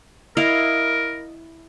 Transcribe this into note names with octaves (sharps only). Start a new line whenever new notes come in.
E4 A#4 D#5 F5